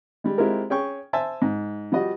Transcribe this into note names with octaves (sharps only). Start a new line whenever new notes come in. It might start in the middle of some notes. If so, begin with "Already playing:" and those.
G3 G#3
G#3 C4 E4 F4 G4 A#4
C#4 G#4 G5 C#6
C5 E5 G#5 A5
G#2
F3 G3 F#4 D#5